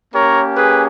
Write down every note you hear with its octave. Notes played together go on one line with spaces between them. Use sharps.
A#3 C#4 G4 A#4 C#5
G#4 B4